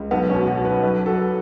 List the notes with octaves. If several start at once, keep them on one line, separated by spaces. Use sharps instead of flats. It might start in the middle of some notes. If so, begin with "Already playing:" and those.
Already playing: C#2
B1 B3
B2 C#4
F#4
F#3
B4
B1 B4
F#3 A4